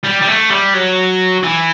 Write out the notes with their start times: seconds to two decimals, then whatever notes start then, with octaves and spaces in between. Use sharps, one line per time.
0.04 G3
0.21 G3
0.27 A3
0.50 G3
0.74 F#3
1.43 E3